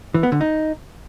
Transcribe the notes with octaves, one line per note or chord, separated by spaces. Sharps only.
E3
B3
D3
D#4